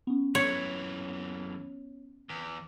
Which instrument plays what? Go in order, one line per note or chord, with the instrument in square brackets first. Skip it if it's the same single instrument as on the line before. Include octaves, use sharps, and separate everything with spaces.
[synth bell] B3 C#4
[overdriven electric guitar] F#2 E3 [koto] C#5
[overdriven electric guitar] E2